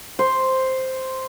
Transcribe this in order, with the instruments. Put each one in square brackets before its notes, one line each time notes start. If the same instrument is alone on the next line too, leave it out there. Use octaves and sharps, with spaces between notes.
[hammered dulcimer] C5